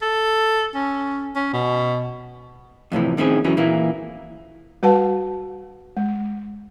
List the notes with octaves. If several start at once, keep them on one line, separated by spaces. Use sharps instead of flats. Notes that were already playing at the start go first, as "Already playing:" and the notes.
A4
C#4
C#4
B2
F2 A2 C3 E3
A2 D#3 C4 C#4 G#4
F#2 E3 F#3 C#4
A#2 E3 A#3 E4
G3 F#4 B4 F#5 A5
G#3